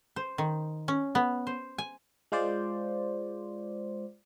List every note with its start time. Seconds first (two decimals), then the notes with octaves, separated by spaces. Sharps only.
0.16 C5
0.38 D#3
0.88 C#4
1.15 B3
1.47 C5
1.78 G#5
2.32 G#3 F4 C5 D5